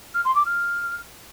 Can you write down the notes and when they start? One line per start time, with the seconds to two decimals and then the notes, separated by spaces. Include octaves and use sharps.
0.14 F6
0.25 C6
0.35 D6
0.46 F6